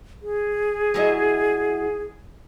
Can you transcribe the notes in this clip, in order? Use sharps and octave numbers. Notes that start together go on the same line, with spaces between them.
G#4
F#3 E4 D#5